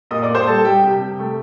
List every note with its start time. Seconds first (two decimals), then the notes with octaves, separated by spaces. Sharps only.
0.11 A#2 D#5 D#6
0.23 D5 D6
0.29 A#2
0.35 C5 C6
0.46 G3 A4 A5
0.64 G3 G4 G5
0.83 C3 G4 G5
1.01 C3
1.19 A3